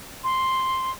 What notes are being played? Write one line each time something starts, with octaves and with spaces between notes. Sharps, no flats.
C6